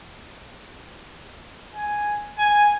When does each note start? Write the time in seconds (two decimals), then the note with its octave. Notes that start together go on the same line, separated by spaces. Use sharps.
1.75 G#5
2.38 G#5